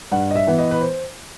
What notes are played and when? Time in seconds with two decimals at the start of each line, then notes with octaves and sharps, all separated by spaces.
0.12 G2 F#5
0.31 D#5
0.35 E5
0.47 E3 B3
0.59 D#5
0.71 B4
0.81 C5